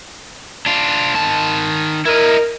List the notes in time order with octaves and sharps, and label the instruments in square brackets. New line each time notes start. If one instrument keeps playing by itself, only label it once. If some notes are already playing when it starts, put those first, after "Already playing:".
[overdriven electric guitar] D4 F4
D#3 A5
[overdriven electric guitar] E4 D#5 [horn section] A#4